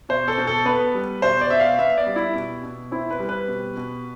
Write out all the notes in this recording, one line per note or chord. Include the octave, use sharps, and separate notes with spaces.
B2 C5
A4
B2
A4
B3 B4
G3
B2 C5
D5
B2 E5
F5
B3 E5
D5
G3
E4
B2
B2
C4 E4
B4
G3
B4
B2
B2